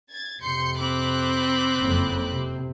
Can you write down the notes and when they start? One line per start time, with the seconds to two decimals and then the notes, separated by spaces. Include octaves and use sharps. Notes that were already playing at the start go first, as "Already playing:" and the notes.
0.10 G#6 A6
0.42 F2 C3 C6 G6 C#7
0.78 C4 B5 D6 F#6
1.78 F#1 F2
2.31 C3